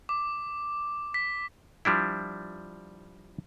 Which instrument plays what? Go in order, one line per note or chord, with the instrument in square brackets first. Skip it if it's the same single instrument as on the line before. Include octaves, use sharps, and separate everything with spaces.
[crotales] D6
B6
[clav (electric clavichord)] F3 G3 D4 E4